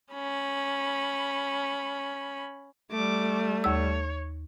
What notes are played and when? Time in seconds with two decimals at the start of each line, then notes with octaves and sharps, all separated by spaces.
0.13 C#4 B5
2.92 G3 A3 D6
3.64 D#2 C#5 E6